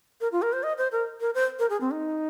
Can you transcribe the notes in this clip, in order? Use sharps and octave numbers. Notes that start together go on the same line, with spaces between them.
A#4
F4
A#4
C5
D#5
C5
A#4
A#4
C5
A#4
G#4
C4
D#4